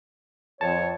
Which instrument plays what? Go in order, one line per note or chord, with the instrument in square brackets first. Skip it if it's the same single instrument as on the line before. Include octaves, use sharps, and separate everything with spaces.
[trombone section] F2 [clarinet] C#5 [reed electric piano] A5